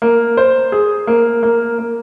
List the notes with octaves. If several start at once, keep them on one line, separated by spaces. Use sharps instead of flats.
A#3
C5
G#4
A#3
A#3
A#3